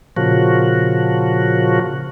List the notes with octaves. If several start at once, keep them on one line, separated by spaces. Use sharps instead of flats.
A#2 C#3 F3 F#4